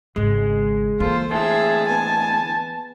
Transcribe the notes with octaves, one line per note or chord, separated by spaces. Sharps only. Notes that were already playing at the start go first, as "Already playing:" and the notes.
G#1 C#3 G#3
E3 A#3 F4 A4 C5
A2 D3 G#4 C5 E5 A5
B3 G#5